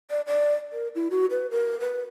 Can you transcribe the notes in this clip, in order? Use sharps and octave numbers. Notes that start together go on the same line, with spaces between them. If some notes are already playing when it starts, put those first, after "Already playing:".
D5
D5
A#4
E4
F#4
B4
A#4
B4